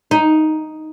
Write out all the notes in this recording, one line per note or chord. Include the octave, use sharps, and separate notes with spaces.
D#4